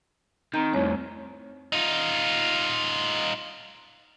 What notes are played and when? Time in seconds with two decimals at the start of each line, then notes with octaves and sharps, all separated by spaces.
0.54 D#3 C4 A#5 G6
0.74 C2 F2 A2 C#5
1.73 D#4 F4